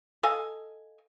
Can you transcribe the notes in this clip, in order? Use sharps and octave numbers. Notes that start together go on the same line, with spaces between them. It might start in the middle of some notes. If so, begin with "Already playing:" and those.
A4 D#5 F5 G#5